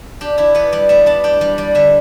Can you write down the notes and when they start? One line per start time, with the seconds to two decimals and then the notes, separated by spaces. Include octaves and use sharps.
0.21 D4 G4
0.38 D4 E4
0.55 B3 B4
0.72 G3 D5
0.89 B3 E5
1.06 D4 A5
1.24 D4 G5
1.41 G3
1.58 G3 D5
1.75 D3 E5